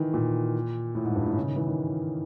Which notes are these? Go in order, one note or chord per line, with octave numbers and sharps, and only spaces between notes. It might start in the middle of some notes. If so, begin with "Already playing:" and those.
Already playing: D#3 E3
A#2
A2
G#2
G2
A2
C#3
D#3
E3
D#3